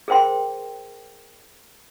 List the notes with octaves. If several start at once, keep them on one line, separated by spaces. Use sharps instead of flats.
G#4 A#4 C5 G5 C6